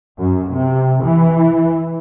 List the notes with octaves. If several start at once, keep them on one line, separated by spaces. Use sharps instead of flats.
F#2
C3
E3